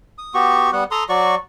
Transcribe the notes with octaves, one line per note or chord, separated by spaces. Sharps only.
D#6
B3 F#4 G4 C#6
G3 B3 F#5
A4 A#5 C6 D#6
F#3 F#4 D5 C#6